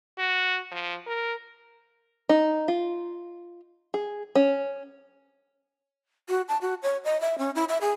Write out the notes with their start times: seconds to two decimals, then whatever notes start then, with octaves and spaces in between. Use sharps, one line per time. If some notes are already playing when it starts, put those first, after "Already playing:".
0.18 F#4
0.71 F3
1.06 A#4
2.29 D#4
2.68 F4
3.94 G#4
4.35 C#4
6.29 F#4
6.48 A5
6.61 F#4
6.83 C#5
7.05 D#5
7.21 E5
7.39 C#4
7.55 E4
7.69 E5
7.81 G#4